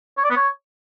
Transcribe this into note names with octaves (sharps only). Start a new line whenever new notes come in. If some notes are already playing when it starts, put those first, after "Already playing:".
C#5
D5
B3
C#5